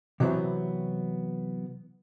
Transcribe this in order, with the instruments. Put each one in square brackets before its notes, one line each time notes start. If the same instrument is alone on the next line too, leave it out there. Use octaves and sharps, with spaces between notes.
[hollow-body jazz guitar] C3 E3 F#3 G3 B3 C4